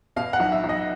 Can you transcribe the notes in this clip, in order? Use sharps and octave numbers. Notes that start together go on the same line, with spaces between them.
B2 F5
F#5
B1
E5
B1
D#5